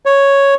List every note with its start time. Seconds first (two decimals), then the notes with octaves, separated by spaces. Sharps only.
0.06 C#5